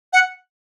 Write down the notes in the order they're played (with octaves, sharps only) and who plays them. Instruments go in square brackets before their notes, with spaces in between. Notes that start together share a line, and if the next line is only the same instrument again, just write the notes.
[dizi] F#5